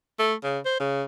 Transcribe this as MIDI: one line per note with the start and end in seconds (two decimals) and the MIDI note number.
0.19 0.34 57
0.44 0.59 49
0.65 0.79 72
0.80 1.04 49